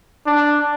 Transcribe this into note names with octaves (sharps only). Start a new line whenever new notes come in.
D4